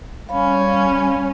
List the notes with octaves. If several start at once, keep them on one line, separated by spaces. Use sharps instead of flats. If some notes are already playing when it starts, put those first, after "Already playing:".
G3 C#4 F5 B5